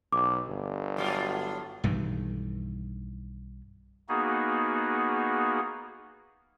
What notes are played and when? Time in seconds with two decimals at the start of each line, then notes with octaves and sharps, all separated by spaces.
0.12 B1 D6
0.48 G1
0.97 A2 F#3 F4
1.84 B1 G2 D#3 E3
4.09 A#3 B3 D#4 F#4 G#4